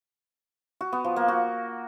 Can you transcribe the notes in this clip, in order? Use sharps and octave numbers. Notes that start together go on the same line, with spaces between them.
F#4
B3
F3
A#3
F#4